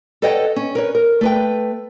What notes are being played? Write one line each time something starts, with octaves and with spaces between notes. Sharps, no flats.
A4 B4 C#5 D#5 F#5 G5
C#4
A#4 B4 C#5
A#4
A3 B4 G5